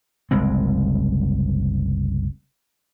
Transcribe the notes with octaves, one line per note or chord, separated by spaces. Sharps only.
F#1 C2 G#3 C4